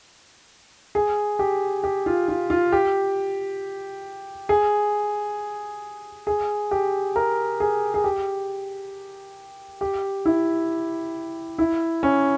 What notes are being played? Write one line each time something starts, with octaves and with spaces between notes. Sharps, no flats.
G#4
G4
G4
F4
F4
F4
G4
G#4
G#4
G4
A#4
G#4
G#4
G4
G4
E4
E4
C#4